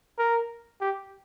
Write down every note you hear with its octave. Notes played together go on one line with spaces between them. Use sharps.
A#4
G4